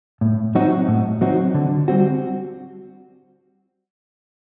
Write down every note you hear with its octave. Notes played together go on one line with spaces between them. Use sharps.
A2
F#3 C4 D#4 F#4
A2
F#3 C4 D#4 F#4
D3
G3 C4 F#4